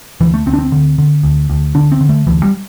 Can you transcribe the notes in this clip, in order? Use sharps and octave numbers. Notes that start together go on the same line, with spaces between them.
D2 E3
A3
D2 C4
D4
C4
D3
D3
D2
D2
D3 D4
C4
D3
A3
D2 E3
G3